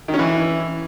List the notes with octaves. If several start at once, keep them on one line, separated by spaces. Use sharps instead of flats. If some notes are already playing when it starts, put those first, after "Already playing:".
D#3
C#4
E3